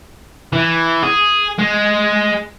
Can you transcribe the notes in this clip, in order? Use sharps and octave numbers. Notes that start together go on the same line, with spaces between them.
E3
G#4
G#3